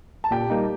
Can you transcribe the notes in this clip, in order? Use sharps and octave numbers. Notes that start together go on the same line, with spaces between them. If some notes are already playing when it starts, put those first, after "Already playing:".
A5
A#2 G4 G5
G3 A#3 D#4